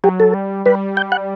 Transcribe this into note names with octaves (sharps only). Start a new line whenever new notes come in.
F#3 G4
A4
G3
G3 B4
G5
F#5